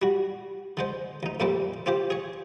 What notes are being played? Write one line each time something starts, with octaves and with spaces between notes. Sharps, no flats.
G3 F#4
D3 G#3 C5
D2 D#4
F2 A#2 G3 G#3 A#3 C4
C4 F4 G4 C5
G#4 C#5